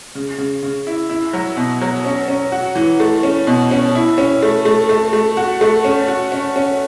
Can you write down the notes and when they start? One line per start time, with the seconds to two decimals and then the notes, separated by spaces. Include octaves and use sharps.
0.15 C#3
0.38 C#3
0.63 C#3
0.87 E4
1.09 E4
1.33 F#3
1.57 B2
1.82 F#3
2.05 C#4
2.28 C#4
2.52 F#4
2.75 E3
3.00 A3
3.23 C#4
3.47 B2
3.71 C#4
3.95 E4
4.18 C#4
4.42 A3
4.65 A3
4.89 A3
5.13 A3
5.37 F#4
5.61 A3
5.85 C#4
6.08 F#4
6.32 C#4
6.56 C#4